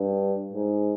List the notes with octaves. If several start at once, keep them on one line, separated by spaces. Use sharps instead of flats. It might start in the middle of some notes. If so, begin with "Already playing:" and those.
Already playing: G2
G#2